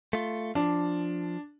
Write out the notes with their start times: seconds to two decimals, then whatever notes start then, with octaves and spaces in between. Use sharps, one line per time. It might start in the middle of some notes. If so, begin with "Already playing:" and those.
0.13 A3 F4
0.55 F3 D4